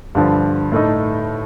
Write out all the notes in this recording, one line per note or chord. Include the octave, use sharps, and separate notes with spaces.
G2 D3 F3
A2 A3 D#4